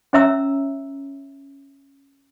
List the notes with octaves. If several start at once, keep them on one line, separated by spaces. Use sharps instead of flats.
C#4 C#5 E5 A#5 E6